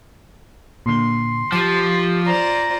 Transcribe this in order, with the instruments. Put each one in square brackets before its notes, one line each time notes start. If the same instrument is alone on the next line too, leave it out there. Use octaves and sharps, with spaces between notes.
[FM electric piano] A#2 D3 [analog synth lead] C6
[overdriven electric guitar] F3 [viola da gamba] G4 [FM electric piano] D6 A6
[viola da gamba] F4 C5 D5 [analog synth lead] A#5